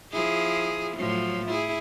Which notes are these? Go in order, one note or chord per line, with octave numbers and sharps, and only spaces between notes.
F3 E4 G#4
A2 F3 F#3
E4 G#4